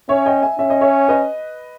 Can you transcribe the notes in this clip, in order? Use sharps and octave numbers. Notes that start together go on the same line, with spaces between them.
C#4 C#5 E5
D#5 G5
E5 G#5
C#4 E5
D#5
C#5 E5
B4 D#5